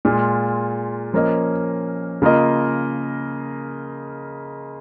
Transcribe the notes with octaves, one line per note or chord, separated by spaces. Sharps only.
A#2 G#3 F4
F3 A#3 C#4 A#4 D#5
C#3 A#3 F4 A#4 D#5